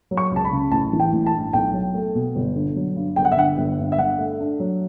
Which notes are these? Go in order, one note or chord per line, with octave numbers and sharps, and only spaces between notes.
F#3
C#6
C#2 A5
B5
C#3
A1 A5
E3
G5
A1
A5
G2
B1 G5
F#3
A3
B2
G1
D3
F#3
G2
G1 G5
F#5
E5
D3 F#5
G1
G2
E5
G2 F#5
A3
D4
F#3